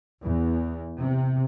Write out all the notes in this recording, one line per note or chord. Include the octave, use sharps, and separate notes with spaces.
E2
C3